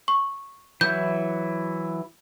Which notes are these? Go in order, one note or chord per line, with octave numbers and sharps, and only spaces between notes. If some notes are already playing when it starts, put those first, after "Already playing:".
C#6
E3 F#3 E4 G6